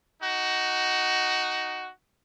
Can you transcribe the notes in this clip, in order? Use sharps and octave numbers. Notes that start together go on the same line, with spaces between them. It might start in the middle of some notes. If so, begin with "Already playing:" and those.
D#4 F#4